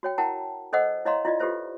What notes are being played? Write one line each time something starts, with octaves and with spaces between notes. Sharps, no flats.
F#4 C#5 G5
E4 A#4 F#5 G5 A5 A#5
A4 C5 D#5 F#5 E6
E4 C#5 D#5 F5 A#5 C6
E4 F4 D5 D#5
F4 G4 A4 B4 C5 E5